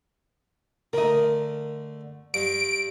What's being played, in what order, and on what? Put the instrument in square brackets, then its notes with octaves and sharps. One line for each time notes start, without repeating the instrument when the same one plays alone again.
[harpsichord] D3 A3 [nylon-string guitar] A#4 D#5
[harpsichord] G2 [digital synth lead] D7